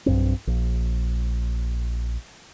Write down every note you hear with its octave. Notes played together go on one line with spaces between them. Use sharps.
B1 G2 C4
A#1